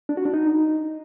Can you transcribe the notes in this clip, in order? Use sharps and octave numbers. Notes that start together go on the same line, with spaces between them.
D4
F#4
D4
D#4